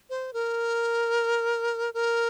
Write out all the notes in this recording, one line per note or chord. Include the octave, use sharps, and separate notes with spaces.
C5
A#4
A#4